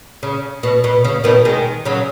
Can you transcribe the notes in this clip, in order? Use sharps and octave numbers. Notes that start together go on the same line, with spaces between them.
C#3
B2
B2
C#3
B2 D#3
D#3 G#3
C#3 F#3